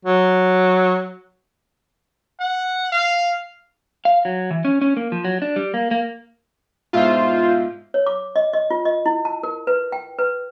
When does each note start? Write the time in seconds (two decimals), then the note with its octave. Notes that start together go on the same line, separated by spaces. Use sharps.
0.05 F#3
2.40 F#5
2.92 F5
4.05 F5
4.25 F#3
4.51 E3
4.65 C#4
4.82 C#4
4.97 A#3
5.12 F3
5.25 F#3
5.42 D4
5.56 G3
5.74 A#3
5.91 A#3
6.93 G#2 B2 E4 F4 C5
7.94 C#5
8.06 D6
8.36 D#5
8.53 D#5
8.71 F4
8.85 D#5
9.06 E4
9.25 A5
9.43 A#4
9.67 B4
9.92 G5
10.19 B4